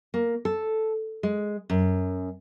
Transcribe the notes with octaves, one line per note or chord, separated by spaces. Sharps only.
A#3
A4
G#3
F#2